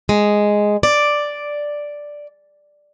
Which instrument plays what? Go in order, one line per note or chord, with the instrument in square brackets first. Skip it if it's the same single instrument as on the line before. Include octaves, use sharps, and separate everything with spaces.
[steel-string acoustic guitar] G#3
D5